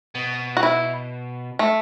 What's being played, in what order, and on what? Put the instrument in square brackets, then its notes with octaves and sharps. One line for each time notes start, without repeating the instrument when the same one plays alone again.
[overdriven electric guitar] B2
[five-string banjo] F#4
E4
A3